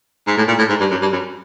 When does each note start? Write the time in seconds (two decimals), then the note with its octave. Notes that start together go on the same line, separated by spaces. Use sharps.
0.27 G#2
0.37 A2
0.47 A#2
0.58 A2
0.69 G#2
0.80 G2
0.90 F#2
1.01 G2
1.12 F#2